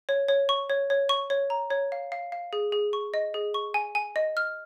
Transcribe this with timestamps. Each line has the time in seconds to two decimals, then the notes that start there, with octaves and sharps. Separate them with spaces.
0.09 C#5
0.28 C#5
0.49 C#6
0.70 C#5
0.90 C#5
1.09 C#6
1.30 C#5
1.50 A#5
1.71 C#5
1.92 F5
2.12 F5
2.32 F5
2.53 G#4
2.72 G#4
2.93 C#6
3.14 D#5
3.34 G#4
3.54 C#6
3.74 G#5
3.95 G#5
4.16 D#5
4.37 F6